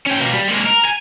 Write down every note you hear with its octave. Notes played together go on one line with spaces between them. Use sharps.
C#4 G5
B2 A#3
G3
G#3 A#3
A#4
G#5